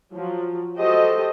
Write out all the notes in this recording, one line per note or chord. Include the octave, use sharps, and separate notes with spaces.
F3 F#3
F#4 G4 A4 C5 D#5